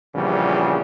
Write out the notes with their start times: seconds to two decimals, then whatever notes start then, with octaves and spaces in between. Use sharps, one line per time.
0.15 A#1 E2 C#3 G3